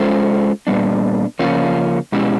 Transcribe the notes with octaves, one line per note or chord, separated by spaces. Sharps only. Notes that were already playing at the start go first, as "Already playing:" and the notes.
Already playing: G#3 C#4 F4 A4 C5
A#2 G3 B3 D4
C#3 F3 A#3 C#4 F4
B2 G#3 C#4 E4 G4